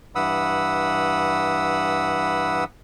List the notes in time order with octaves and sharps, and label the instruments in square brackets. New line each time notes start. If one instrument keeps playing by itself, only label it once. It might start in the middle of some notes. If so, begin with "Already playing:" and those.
[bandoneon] G2 E3 F#5 B5 D#6 E6